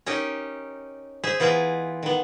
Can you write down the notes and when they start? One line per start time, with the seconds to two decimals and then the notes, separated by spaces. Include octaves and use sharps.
0.06 C#4 D#4 G4 A#4 D#5
1.24 G#4 C5 E5
1.40 E3 B3 F4 G#4 A#5
2.03 D#3 B3